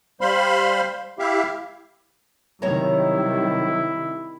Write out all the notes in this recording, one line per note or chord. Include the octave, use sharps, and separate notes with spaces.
G3 C5 F5 B5 C6
E4 G4 E5 F5
C3 D#3 F#3 G3 E4 C#5 A#5